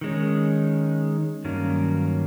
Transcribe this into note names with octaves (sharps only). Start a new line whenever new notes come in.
D#3 G#3 C#4
G2 D#3 F#3 A#3 C#4